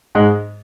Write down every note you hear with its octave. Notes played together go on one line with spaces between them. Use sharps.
G#2 G#3